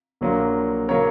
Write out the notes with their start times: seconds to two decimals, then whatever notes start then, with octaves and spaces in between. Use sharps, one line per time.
0.21 A#1 A#2 F#3 A#3
0.89 C#3 F#3 A#3 A#4 C#5